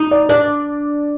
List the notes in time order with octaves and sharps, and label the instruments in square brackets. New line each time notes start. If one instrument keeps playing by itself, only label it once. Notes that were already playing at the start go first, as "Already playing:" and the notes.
Already playing: [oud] D#4
[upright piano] D5
[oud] D4 [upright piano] D5